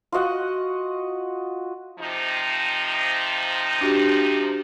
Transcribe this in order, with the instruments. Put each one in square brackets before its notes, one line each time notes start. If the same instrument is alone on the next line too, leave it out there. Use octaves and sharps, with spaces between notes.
[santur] F4 F#4 D#5 F#5
[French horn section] C3 F3 D#4
[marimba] D4 F#4 G4